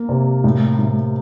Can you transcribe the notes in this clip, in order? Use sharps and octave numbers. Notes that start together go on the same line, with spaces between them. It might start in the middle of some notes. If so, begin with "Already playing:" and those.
Already playing: A#3
C3
A2
A2